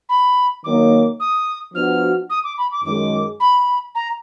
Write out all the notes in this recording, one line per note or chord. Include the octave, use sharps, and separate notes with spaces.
B5
D#3 F#3 A#3 D#4 D6
D#6
F3 B3 D4 F#4 F6
D#6
D6
B5
D6
F#2 D#3 G#3 D6
B5
A#5